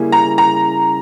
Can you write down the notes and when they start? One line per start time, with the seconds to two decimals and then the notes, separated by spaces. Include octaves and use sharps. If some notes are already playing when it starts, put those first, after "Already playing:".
Already playing: C#3 G3 A#3 E4 G#4
0.12 A#5
0.38 A#5